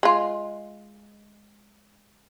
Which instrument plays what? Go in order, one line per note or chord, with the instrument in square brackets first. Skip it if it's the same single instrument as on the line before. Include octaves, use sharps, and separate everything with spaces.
[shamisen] G#3 F4